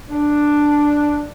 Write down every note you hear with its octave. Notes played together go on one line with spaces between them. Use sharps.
D4